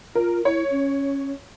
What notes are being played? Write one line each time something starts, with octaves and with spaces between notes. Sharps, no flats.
F4 A#4
E4 C#5
C#4